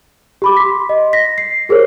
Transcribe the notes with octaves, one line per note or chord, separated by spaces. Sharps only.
G4 B5 D6
C6 B6
D#5
A#6 B6
C7
G4 G#4 A#4 C5 C#5